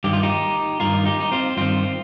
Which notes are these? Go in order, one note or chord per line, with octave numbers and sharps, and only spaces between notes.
G2 D#3 G4
F4
D#4 G4
G2 D#3 F4 A#4
D#4 G4
D#4
C4 F4
G2 D#3 C4 F4